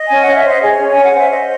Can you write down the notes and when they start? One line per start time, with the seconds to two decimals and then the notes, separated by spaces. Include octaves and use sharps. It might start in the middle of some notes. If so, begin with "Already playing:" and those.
Already playing: D#5
0.08 C#4 G#5
0.22 C#4 F#5
0.34 E5
0.44 C5 D#5
0.61 G#4 C#5
0.78 C#4
0.90 G#5
0.96 C#4
1.04 F#5
1.14 C5 E5
1.31 C5 D#5